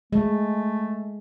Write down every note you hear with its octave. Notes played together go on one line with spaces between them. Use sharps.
G#3 A3